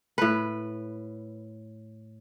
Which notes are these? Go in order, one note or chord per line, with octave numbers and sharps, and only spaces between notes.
A2 B4